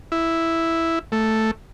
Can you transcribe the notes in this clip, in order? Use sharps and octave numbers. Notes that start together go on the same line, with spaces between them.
E4
A3